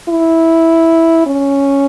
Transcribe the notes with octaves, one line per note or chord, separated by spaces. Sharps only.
E4
C#4